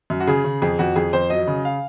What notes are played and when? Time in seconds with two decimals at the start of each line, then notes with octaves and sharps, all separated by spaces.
0.10 F#2
0.20 F#4
0.27 C#3 G#4
0.44 C#3
0.62 F2 G#4
0.79 F2 F#4
0.96 F2 G#4
1.13 F2 C5
1.30 F#3 D#5
1.47 C#3
1.65 F5